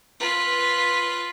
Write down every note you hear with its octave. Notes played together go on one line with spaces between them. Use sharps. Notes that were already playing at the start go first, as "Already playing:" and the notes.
F4 B4